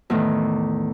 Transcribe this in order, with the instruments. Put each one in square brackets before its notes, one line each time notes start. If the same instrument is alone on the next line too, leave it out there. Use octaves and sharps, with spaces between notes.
[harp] E2 A2 D#3